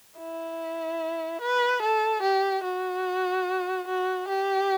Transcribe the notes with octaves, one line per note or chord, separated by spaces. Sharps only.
E4
B4
A4
G4
F#4
F#4
G4